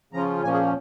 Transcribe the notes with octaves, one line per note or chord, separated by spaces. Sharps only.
C#3 F3 C#4 F4 A#5
A#2 F3 A#3 C#4 G#5
G#4